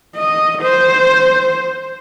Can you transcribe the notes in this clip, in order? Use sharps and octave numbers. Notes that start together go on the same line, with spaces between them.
D#5
C5